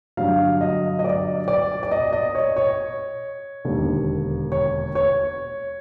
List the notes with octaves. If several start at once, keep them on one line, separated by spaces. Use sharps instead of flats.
G2 D3 F#3 F5
D#5
D#5
D5
D5
D5
D#5
D#5
C#5
C#5
E1 D#2 D3
C#5
C#5